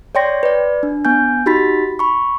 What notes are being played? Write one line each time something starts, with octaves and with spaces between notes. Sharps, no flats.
C#5 D5 G5 C6 A#6
B4 D5
D4
B3 G#5 G6
D#4 F#4 G4 B5 A6 B6
B5 C#6